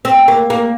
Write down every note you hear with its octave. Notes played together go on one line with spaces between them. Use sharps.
C4
A#3
A#3